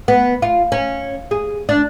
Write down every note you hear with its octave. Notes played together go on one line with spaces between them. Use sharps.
B3
F4
C#4
G#4
D4